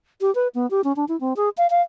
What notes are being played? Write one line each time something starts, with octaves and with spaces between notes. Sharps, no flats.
G4
B4
B3
G4
C#4
D4
E4
C4
G#4
F5
F5